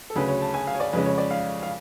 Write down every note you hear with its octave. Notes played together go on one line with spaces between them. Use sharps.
A4
D2 C#3 F#3 C#4 B4
C#5
A5
G#5
F5
C#5
D5
F2 C#3 G#3 C#4 B4
C#5
D5
F5
F5